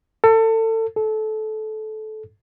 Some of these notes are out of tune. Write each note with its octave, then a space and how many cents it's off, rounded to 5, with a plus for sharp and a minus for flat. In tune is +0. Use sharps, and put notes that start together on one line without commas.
A4 +30
A4 -20